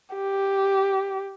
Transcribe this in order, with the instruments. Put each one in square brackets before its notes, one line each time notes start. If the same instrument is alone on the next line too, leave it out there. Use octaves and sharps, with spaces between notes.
[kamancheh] G4